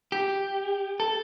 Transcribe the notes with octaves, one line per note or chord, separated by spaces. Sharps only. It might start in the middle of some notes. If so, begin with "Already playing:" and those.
G4
A4